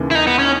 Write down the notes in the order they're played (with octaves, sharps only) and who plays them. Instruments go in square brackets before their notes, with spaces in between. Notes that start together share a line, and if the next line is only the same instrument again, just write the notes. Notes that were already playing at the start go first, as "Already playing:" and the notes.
Already playing: [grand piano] D#2 C#3 E3 A#3
[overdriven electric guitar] E4
D#4
B3
C#4